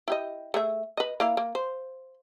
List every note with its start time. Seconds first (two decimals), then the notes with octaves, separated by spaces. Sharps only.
0.08 E4 G4 D#5
0.54 A3 G#4 E5
0.97 B4 D#5
1.20 A#3 E4 F5
1.37 A#3
1.55 C5